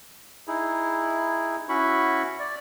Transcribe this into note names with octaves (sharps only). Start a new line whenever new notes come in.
D#4 E4 G#4
C#4 E4 F#4 B5 C#6
D5